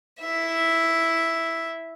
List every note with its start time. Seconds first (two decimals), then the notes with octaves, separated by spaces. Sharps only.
0.20 E4 E5